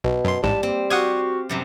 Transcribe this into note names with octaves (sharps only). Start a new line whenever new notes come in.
B1 B2
F#2 C6
A1 G#2 G3 A5
A#3 C4
F#4 G4 F5 F#5 D#6 G#6
F#2 C3 G3